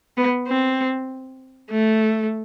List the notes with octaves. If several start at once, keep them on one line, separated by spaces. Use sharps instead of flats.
B3
C4
A3